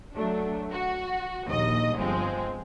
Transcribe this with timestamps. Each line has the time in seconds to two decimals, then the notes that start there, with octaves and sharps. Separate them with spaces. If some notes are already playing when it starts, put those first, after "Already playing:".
0.15 F#3 A3 D4
0.72 F#4
1.47 A#1 D#2 D#5 D#6
1.97 G1 F3 G#3 C4